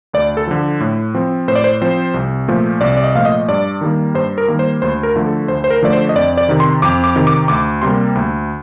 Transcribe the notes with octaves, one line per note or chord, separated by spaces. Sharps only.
D2 D5
A4
D3 F3
A2
F3 C4
A2 C5
D5
C5
F3 C4 C5
C2
A#2 F3 A3
C2 D5
D5
D#5
A#2 F3 A3 F5
D#5
G2 D5
D#3 G3 A#3
G2 C5
A#4
D#3 G3 A#3
C5
D2 C5
A#4
D3 F3 A3
A4
D2 C5
C5
A#4
D3 F3 A3 D5
C5
D#5
F2 D5
D5
C3 D#3
C6
F2 D6
D6
C3 D#3
D6
D2 D6
C3 G3 A#3 C6
D2